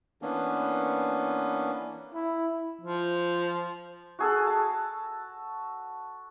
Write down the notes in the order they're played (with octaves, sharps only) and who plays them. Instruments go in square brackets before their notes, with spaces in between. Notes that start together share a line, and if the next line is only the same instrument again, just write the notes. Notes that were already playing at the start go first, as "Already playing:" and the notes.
[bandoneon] E3 A#3 B3 C#4 D4
[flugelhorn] E4
[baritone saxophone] F3
[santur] F#4 G#4 A4
A5